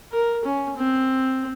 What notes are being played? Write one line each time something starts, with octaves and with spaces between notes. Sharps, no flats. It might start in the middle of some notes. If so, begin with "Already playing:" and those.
A#4
C#4
C4